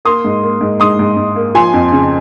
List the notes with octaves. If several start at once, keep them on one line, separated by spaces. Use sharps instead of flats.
A#3 C6 D#6
G#2
A#3
G#2
G#2 C6 D#6
G#2
G#2
A#3
F3 G#5 C6
F2
C#3